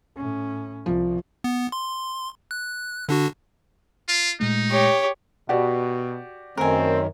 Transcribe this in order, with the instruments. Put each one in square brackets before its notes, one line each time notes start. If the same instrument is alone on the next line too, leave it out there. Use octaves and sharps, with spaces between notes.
[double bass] A2 C#4
[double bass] C2 [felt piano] F3
[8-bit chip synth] B3
C6
F#6
D3 D4 F#4
[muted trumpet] F4
[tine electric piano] A#2 G#3 A3 [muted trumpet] D#4
[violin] G4 C#5
[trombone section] B2 [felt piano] F#4 G4 D5
[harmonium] F#2 D#3 [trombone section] A3 C4 [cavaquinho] A#4 G#5